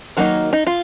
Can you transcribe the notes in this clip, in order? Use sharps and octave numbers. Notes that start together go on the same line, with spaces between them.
D#3 F#3 A#3 D#4
D#4
F4